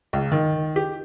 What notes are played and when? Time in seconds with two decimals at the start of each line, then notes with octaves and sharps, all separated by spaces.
0.13 C#2
0.31 D#3
0.76 G4